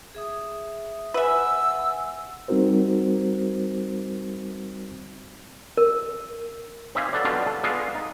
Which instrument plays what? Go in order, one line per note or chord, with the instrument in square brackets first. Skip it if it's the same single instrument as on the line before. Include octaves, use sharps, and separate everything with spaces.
[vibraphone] G#4 E5 D#6
[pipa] B4 E5 [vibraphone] F#5 G#5 [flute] E6
[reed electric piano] G3 C4 D#4 F#4 A#4 C5
[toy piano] A#4
[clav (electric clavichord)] C4 D#4 G4 E5 F5 G#5
F#3 A4 B4 D5
B2 D3 F#3 G3 D4 F4
A4
G#3 B3 D4 F4 G#4 A4
D#4